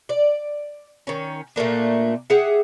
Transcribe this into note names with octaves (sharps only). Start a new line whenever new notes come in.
D5
D#3 C#4
A#2 A3 A#3 D4
G4 G#4 E5 F#5